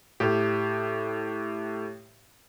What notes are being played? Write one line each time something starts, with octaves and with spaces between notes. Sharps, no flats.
A2 G4